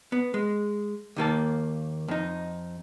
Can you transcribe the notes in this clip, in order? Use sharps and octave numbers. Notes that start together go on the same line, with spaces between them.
B3
G#3
D#2 D#3 A#3 A5
F2 D#4